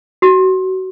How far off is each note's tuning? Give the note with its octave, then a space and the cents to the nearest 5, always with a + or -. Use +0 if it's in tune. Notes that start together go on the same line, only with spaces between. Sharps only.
F#4 +25